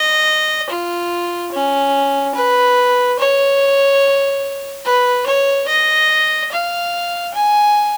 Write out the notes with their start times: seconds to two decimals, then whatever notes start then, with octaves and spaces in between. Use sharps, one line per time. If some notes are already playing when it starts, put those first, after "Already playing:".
Already playing: D#5
0.70 F4
1.52 C#4
2.36 B4
3.19 C#5
4.85 B4
5.27 C#5
5.68 D#5
6.51 F5
7.34 G#5